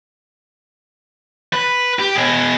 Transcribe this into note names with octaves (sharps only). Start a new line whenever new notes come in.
B4
G4
B2 G#4